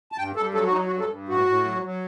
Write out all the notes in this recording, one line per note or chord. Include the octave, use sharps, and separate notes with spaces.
A5
G2 G5
G2 A4
F#3 A4
F#4
F#3 D#4
F#4
G2
A4
G2
A2 F#4
A2
F#3
F#3